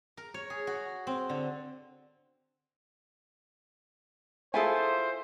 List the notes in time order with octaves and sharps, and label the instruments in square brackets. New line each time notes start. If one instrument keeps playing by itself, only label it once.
[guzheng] A#4
C#5
G#4
F#4
C4
D3
[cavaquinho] E4 F4 A4 [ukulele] G#4 G#5 [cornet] C5